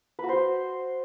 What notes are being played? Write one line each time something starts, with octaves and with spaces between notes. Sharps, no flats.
B4
F#4
C5